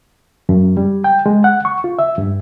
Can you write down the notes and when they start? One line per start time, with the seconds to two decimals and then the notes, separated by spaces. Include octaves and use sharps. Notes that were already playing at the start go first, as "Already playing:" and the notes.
0.49 F#2
0.77 G3
1.04 G5
1.26 G#3
1.44 F#5
1.65 C#6
1.84 F4
1.99 E5
2.18 G2